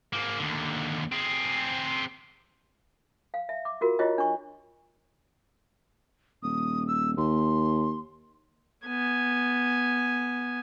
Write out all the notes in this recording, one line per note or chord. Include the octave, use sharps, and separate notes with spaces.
G#2 A#3
D#2 D3
C4 G#4
F5
E5
D6
F4 F#4 A#4
E4 F4 G4 C#5 D#5
D4 C#6
D#1 D#6
E6
D#2 C6
B3 G#5